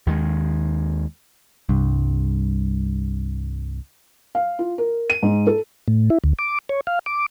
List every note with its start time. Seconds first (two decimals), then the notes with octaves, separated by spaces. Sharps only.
0.06 D#2 D#3 G#3
1.69 C2 G2
4.35 F5
4.59 F4
4.78 A#4
5.10 D#7
5.23 G#2
5.47 A4
5.88 A2
6.10 E4
6.24 D2
6.39 D6
6.69 C#5
6.87 F5
7.06 D6